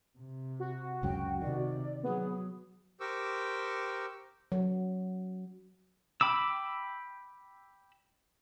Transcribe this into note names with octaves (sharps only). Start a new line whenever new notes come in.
C3
F#4
C#2 F#2 F#3 G5
C3 D#3 D5
F#3 B3 G#4
G4 A#4 C5 C#6 D6 E6
F#3
G5 B5 D6 E6